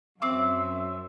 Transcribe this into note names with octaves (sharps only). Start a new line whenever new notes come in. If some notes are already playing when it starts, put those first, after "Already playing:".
F#2 C4 E5 D6